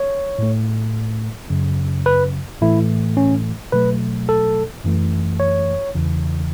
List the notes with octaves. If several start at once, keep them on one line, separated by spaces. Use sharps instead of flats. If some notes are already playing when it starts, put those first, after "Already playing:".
Already playing: C#5
A2 A3
F#2 C#3 F#3
B4
A2 E3 A3 E4
C#4
B2 F#3 A3 B4
A4
F#2 E3 A3
C#5
E2 C#3 E3